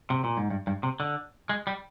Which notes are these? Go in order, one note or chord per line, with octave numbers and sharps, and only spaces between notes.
C3
A#2
G#2
G2
G2
C3
D3
G#3
G3